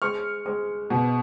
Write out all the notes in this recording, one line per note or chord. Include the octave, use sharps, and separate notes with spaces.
G#3 C#6 F6
G#3
B2